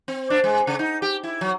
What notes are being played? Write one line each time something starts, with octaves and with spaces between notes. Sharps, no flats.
C4
D4
G#3
C#3
D#4
G4
E4
F#3